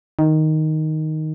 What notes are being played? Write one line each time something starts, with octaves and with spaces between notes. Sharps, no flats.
D#3